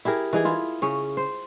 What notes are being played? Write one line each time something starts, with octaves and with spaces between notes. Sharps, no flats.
E4 G4 G#4 A#4
E3 D#4 G#4
E4 F4
C#3 C#4
C5